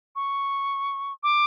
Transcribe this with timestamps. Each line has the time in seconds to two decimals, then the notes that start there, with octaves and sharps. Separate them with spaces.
0.16 C#6
1.23 D6